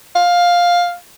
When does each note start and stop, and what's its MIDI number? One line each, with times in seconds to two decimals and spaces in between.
0.15 0.95 77